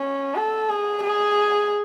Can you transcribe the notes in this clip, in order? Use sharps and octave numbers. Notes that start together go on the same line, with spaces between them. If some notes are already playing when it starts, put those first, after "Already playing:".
Already playing: C#4
A4
G#4
G#4